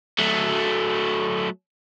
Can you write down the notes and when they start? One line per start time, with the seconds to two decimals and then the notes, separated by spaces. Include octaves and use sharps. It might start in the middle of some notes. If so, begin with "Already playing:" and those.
0.18 F#3 A3